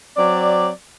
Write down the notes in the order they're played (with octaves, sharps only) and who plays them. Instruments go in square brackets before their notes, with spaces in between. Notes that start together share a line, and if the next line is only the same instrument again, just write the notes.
[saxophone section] F#3 C4 D5